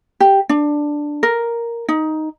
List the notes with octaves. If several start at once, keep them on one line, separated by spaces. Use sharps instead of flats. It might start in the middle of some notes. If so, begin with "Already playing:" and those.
G4
D4
A#4
D#4